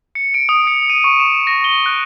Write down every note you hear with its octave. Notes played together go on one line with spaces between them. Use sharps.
C#7
D7
D#6
C#7
D#7
C#6
E7
E7
A#6
G7
F#6